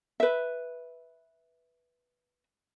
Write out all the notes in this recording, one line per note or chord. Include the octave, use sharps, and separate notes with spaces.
B4 E5